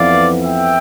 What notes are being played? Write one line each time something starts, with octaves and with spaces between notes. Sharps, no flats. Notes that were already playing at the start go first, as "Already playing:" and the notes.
Already playing: F2 E3 B3 D5 F5
E5 G5